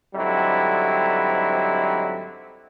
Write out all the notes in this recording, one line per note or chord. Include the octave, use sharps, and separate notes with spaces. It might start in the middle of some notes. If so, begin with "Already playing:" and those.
G#2 D3 F#3 G3 C4 E4